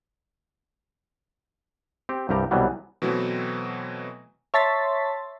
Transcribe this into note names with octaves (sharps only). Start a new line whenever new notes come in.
C4 G4
C2 G2 G3 G4 A#5
C2 B2 E3 F#3 G3
B2 E3 F#3 A3 B3 C4
C#5 E5 A5 C6 A6 B6